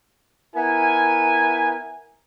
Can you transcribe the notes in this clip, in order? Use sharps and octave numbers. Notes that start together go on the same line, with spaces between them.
B3 E4 A#4 G#5